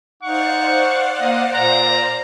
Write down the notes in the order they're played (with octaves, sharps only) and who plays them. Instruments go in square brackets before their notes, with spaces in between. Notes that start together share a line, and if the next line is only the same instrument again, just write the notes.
[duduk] D#4 [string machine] C5 D5 F5 [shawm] F#5 [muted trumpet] C#6
[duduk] A#3 [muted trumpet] D#5
[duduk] A#2 [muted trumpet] A#5